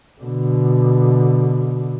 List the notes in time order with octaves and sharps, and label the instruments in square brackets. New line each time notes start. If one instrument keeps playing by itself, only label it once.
[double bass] B2 D3